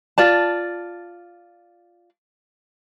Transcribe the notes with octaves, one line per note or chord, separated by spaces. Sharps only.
F4 D5 A5